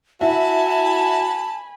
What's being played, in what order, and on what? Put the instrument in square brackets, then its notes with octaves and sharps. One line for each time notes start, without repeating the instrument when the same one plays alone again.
[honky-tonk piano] E4 [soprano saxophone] F#4 [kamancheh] G#5 B5 [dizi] A5